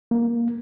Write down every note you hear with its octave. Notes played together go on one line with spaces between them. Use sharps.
A#3